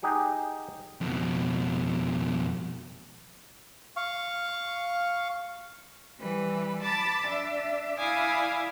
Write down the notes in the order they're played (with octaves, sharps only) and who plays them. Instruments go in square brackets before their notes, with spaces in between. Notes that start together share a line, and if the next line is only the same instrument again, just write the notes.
[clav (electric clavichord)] D#4 G4 G#4 F#5
[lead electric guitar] F2 B2
[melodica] F5 C#6
[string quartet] E3 G3 B4
A5 B5 D6 A6
D4 E5
E4 D5 F5 G#5 D6 D#6